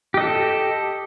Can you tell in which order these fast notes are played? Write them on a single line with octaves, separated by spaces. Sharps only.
G4 D#5 A4